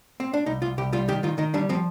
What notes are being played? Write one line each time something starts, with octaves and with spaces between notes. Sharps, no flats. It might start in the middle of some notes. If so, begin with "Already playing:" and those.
C4
D4
C2 D#4
C2 F4
C2 G4
G3 F4
D#3 G4
D#3 F4
D#3 D#4
G3 D4
F3 C4